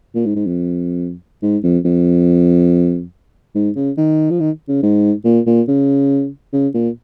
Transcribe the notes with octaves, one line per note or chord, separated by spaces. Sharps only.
A#2
G#2
G#2
F2
G#2
F2
F2
G#2
C#3
D#3
F3
D#3
C#3
G#2
A#2
A#2
C#3
C#3
A#2